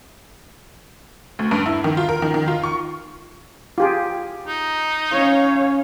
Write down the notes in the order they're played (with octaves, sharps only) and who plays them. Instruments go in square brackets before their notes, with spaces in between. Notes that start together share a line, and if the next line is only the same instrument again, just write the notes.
[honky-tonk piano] D2
G2
E4
D#3
F4
A#4
D#3
D#3
F4
C#6
[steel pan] F4 G4 G#4
[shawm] D#4
[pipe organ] C#4 [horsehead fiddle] C#5 F5